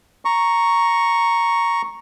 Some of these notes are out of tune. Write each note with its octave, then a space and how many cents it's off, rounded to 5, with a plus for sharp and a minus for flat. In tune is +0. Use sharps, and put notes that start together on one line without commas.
A#5 +0 C#6 +0